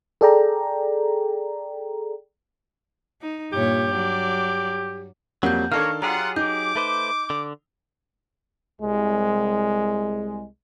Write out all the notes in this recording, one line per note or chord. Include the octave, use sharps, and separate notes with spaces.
G#4 A4 D5 G5 A#5
D#4
G2 A#2 G4 C#5
F#3 D5
F2 F#3 G3 A#3 F#5 G6
D#3 A#3 D4 A4 C#5 F5 F6
F#3 F4 G4 G#4 F#5 A#5
D#4 D6 G6
A3 B4 C5
D3
C2 G#3